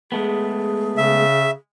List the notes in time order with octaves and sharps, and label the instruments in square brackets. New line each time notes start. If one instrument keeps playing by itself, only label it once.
[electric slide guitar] G#3 A3 B3 [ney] G#4
[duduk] C#3 [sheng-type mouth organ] E5